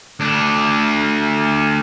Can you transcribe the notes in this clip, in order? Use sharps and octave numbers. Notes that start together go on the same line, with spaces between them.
D2 D4